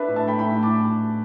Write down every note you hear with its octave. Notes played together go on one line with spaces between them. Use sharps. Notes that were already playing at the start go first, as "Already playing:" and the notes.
Already playing: D4 B4 E5
A2
E5 A5
A3 G5 B5
A2 G5 B5
A2
A5 D6